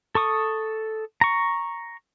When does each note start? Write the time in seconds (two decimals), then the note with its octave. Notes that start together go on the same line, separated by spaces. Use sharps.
0.15 A4 C#6 D#6
1.21 A#5 C#6